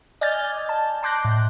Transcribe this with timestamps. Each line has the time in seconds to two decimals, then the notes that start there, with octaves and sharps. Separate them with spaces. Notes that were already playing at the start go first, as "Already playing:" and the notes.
0.21 D5 D#5 G#5 F6 G6 A6
0.69 A5
1.03 A5 C6 D6 F#6 G6 A#6
1.25 A2